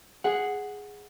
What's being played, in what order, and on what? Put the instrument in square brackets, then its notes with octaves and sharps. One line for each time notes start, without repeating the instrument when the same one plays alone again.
[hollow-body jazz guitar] G#4 F#5